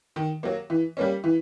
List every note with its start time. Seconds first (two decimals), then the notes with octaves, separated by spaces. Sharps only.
0.16 D#3
0.43 F#3 A#3
0.70 E3
0.97 G3 A#3 C#4
1.24 E3